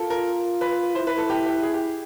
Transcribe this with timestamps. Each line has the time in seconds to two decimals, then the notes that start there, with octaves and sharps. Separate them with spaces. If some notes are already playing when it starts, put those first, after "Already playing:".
Already playing: F4 A4 A#4
0.10 A#4
0.61 B4
0.95 E4 C5
1.07 B4
1.18 A4
1.30 G4
1.46 G4
1.63 G#4
1.74 G4